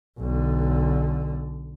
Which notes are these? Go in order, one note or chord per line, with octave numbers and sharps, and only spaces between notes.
B1 D3